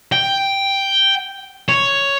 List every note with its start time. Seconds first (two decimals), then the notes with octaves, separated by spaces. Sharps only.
0.12 G5
1.69 C#5